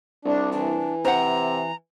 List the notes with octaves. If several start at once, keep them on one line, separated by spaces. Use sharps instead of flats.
C2 D4
E3 D4
C3 C5 F#5 A#5